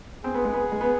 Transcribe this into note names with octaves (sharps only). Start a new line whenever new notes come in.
C4 G#4
B3
G#3
B3
G#3
B3